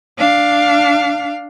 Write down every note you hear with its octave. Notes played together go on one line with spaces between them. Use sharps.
D4 F5